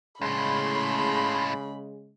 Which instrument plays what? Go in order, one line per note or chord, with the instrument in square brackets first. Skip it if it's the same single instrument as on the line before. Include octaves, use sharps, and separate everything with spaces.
[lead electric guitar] C#2 A2 [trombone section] C#3 G#3 [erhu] B5 [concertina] C6